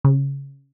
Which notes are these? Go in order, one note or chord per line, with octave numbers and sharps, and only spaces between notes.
C#3